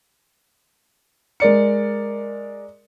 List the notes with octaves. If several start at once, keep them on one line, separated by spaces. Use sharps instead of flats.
G#3 A#4 D5 C#7